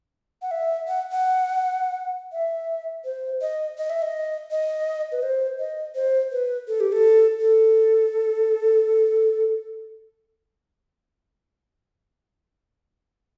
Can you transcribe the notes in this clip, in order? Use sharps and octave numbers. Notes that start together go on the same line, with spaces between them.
F#5
E5
F#5
F#5
E5
C5
D#5
D#5
E5
D#5
D#5
B4
C5
D#5
C5
B4
A4
G4
A4
A4